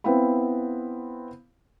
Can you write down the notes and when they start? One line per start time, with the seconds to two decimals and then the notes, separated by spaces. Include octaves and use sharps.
0.04 B3 C4 E4 F5 B5